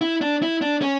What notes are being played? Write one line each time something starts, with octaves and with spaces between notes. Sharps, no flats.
E4
D4
E4
D4
C#4